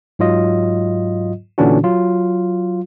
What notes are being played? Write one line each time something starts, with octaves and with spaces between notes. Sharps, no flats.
G#2 F#3 F4 D#5
A#2 D3 E3 C#4 D4 F#4
F#3 F4